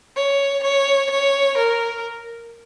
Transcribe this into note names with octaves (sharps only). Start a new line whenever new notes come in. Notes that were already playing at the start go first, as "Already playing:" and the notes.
C#5
C#5
C#5
A#4